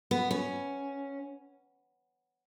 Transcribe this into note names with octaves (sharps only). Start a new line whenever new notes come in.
B3
C#4